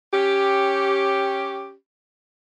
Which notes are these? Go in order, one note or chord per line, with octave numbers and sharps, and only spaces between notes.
C#4 G4